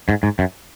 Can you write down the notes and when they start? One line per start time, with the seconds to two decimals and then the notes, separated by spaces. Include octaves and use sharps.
0.09 G#2
0.23 G#2
0.39 F#2